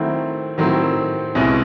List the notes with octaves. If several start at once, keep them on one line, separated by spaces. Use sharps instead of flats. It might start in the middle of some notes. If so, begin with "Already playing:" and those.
Already playing: D#3 F#3 A3 C4 E4
D#3 F#3 A3 C4 E4
C2 B2 G#3 C#4 E4